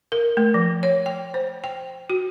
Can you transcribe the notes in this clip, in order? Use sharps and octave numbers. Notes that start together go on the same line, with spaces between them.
A#4
A3
F3
C#5
G5
C5
G5
F#4